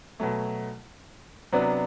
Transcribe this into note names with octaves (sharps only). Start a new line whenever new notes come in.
B2 F#3 A3
C3 F#3 B3 D4